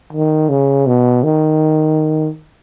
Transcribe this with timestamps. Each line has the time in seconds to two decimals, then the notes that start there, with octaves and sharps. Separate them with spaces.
0.13 D#3
0.49 C#3
0.87 B2
1.24 D#3